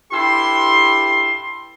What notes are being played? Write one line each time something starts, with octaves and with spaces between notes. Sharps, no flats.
G2 E4 G4 A4 C6